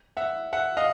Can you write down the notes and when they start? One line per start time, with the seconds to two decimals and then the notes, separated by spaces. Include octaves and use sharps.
0.17 E5 F#5
0.53 E5 F#5
0.77 D#5 F5